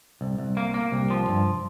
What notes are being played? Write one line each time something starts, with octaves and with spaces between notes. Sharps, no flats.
C2
C2
A#3
A#3
C2
F3
G2